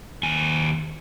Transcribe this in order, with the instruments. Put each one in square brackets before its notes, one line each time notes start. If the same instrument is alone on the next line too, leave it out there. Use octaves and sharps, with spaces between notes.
[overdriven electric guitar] D#2 G#5